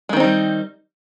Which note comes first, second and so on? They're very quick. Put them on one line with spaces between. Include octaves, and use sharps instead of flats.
G#3 D#3 C4 D#4 G3